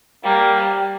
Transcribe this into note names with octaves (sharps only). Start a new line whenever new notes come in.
G3 A#3